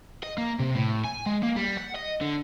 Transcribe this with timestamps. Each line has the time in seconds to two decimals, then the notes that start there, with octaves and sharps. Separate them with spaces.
0.23 D#5
0.38 A#3
0.59 C3
0.75 A2
1.04 G#5
1.26 G#3
1.43 A#3
1.56 G3
1.77 F#5
1.96 D#5
2.21 D3